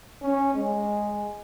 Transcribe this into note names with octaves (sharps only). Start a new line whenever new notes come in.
C#4
G#3